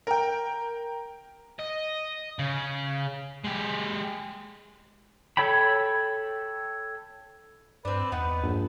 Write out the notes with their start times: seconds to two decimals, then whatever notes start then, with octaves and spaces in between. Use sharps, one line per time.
0.07 A#4 G5
1.59 D#5
2.39 C#3
3.44 G#3 G4
5.37 A4 C#5 G5 B5
7.85 G2 C4 D4 B4
8.12 E2 B3 D#4 F#5
8.43 A#1 G2